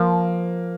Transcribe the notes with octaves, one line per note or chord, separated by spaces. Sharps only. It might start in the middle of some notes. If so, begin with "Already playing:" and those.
Already playing: F3 A#3